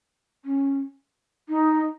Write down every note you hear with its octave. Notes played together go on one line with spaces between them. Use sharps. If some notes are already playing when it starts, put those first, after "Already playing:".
C#4
D#4